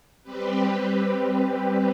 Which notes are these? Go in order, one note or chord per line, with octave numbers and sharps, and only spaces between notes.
G3 C4 G4 B4